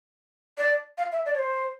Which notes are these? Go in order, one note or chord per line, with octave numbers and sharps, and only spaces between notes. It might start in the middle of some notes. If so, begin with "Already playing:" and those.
D5
F5
E5
D5
C#5
C5